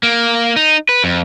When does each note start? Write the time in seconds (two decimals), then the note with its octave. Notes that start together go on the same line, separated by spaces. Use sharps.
0.03 A#3
0.56 D#4
0.89 B4
1.04 F2